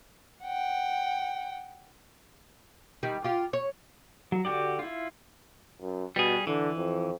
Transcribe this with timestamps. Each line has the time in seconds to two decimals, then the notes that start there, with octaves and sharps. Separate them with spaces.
0.44 F#5 G5
3.03 D#3 G3
3.24 F4 G4
3.53 C#5
4.32 F#3
4.45 D3 F#4 G4 D5
4.79 E4 F4
5.82 F#2
6.16 B2 G3 G#4
6.47 D3 E3
6.77 F2